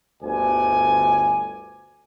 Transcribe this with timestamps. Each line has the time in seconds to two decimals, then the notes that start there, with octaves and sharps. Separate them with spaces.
0.22 G1 D2 D5 G#5